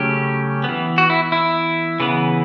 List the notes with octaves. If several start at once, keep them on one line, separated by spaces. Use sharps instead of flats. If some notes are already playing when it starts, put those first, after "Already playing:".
Already playing: C#3 F#3 A3 C#4 G4
E3 B3
F#4
E4
E4
C#3 E3 B3